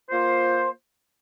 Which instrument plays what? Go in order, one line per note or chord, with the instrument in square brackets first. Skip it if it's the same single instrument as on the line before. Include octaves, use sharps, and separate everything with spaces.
[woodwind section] A#3 F4 C5